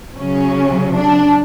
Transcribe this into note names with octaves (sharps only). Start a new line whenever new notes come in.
C#3 F#3 C#4
D4